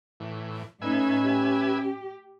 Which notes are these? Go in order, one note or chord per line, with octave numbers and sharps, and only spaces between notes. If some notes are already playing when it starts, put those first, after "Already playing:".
A2 E3
A2 C#4 D#4 B4 E5 G#5
G4